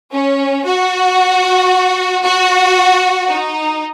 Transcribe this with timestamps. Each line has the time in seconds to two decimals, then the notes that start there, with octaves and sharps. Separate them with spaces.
0.12 C#4
0.65 F#4
2.23 F#4
3.28 D#4